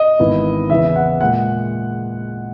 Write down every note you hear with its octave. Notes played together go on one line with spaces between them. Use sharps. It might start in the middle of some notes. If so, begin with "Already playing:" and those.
Already playing: D#5
G#1 G#2 E3 B3 E4
E2 C#3 E3 B3 E5
F#5
A#2 G#3 F#5